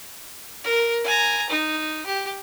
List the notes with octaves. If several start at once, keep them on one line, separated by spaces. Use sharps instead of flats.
A#4
G#5 A#5
D#4
G4